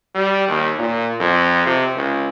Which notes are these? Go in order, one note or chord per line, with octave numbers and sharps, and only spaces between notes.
G3
D#2
A#2
F2
C3
C#2